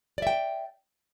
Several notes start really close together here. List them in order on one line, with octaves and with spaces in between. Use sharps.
D5 E5 G5